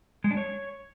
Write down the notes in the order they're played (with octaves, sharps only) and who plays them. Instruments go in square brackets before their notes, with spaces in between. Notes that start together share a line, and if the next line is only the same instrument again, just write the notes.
[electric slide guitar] G#3
D4
C#5